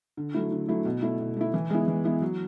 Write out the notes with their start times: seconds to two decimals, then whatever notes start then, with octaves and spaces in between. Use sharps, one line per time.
0.17 D3
0.34 F#3 A3 E4
0.52 D3
0.68 F#3 A3 E4
0.85 B2
1.02 A3 E4
1.20 B2
1.37 A3 E4
1.54 E3
1.70 G#3 B3 E4
1.88 E3
2.04 G#3 B3 E4
2.22 F#3